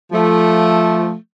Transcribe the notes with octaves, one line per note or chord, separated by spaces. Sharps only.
F3 A3